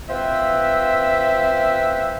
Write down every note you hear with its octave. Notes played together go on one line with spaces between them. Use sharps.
C4 F4 B4 C5 E5